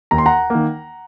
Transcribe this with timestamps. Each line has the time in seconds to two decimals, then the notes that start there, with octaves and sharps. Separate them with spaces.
0.11 D#2 A#5
0.18 C6
0.26 F#5 A#5
0.50 D#3 A#3